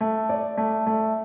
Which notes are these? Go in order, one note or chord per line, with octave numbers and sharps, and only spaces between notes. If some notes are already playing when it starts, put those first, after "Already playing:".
A3
D5
A3
A3